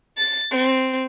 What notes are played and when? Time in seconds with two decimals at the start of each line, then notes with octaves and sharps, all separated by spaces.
0.18 A6
0.51 C4